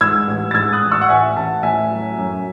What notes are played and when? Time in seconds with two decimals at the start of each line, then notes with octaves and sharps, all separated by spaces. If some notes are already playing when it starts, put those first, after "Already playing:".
0.01 G#2 E6 G#6
0.28 A1
0.51 A6
0.54 G#2 E6 G#6
0.73 D#6 F#6
0.82 A1
0.92 C#6 E6
1.01 F#5
1.09 A1 E5 G#5
1.37 A1 F#5 A5
1.63 A2 E5 G#5
1.91 F#3
2.18 F#2